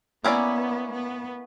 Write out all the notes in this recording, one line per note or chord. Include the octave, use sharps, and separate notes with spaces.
A#3 B3 C#4 E4 B4 D5
B3